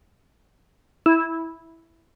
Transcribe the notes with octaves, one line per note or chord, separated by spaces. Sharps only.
E4